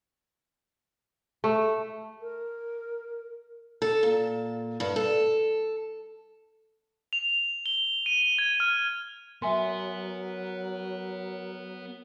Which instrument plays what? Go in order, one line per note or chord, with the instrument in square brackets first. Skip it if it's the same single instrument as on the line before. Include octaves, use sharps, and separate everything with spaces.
[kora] A3
[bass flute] A#4
[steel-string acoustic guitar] A4
A#2
G2
A4
[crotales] F7
G7
D#7
G#6
F6
[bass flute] F#3 [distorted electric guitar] B3 [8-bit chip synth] A#4 [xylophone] E5 G#5 C6